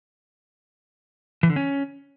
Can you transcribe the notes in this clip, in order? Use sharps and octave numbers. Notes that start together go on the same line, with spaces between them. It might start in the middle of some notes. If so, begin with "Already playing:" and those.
E3
D3
C#4